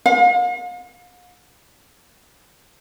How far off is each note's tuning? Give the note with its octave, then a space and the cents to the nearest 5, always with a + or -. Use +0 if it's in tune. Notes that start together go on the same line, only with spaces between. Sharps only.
F5 +45